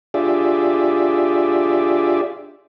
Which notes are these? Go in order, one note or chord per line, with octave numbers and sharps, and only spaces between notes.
D4 F4 G4 G#4 D5 E5